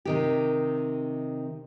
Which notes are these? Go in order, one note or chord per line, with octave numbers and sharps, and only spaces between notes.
C3 D#3 G4